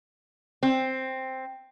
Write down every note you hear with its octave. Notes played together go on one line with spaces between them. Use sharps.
C4